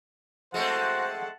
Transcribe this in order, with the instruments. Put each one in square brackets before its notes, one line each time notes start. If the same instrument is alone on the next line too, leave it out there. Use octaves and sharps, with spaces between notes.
[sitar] G#3 A3 C4 [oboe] F#4 [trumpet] C5 [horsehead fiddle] F#5 A5